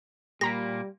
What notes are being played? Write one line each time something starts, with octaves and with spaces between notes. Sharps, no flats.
A#2 G3 A#3 G4 A#5 B5 A#6